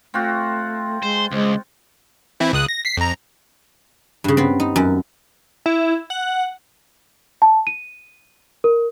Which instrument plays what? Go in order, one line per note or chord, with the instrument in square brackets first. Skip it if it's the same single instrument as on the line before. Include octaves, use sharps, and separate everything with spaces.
[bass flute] A3 [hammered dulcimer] C4 F4 F#4
[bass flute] G#3 [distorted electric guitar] C5
[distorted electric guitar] C#2 [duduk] G#3 [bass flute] C5
[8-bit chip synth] E3 C4 E4
C#2 D#6 F#6
A#6
B6 C7
F2 A#5
[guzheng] G2 C#3
B3 C4
D#4
F#2
[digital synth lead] E4
F#5
[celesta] A5
D#7
A#4